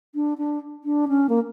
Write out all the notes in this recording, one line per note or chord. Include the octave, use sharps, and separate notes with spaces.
D4
D4
D4
C#4
A#3